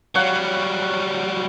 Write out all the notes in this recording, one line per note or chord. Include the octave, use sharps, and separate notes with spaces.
F#3 G3 C#5 F5 F#5